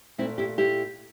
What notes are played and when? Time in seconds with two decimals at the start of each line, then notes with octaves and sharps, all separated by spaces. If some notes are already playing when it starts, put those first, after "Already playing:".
0.18 A#2 A3 C4 E4
0.38 E4 G4
0.58 E4 G4